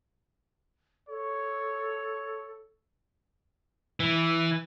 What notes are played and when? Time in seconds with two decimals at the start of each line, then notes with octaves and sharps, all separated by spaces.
1.09 A4 C#5
4.00 E3